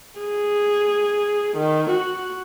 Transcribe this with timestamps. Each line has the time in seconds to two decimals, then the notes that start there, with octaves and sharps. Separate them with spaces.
0.19 G#4
1.57 D#3
1.91 F#4